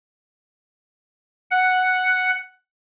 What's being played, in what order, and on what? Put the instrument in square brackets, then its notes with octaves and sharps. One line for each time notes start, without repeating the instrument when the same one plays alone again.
[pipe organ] F#5